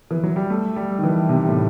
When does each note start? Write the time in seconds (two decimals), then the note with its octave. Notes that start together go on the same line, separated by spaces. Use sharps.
0.11 E3
0.23 F#3
0.36 G3
0.50 A3
0.76 G3
0.99 D#3
1.03 E3
1.29 C3
1.48 A2